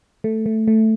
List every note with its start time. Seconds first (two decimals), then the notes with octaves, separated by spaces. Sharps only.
0.24 A3
0.46 A3
0.68 A3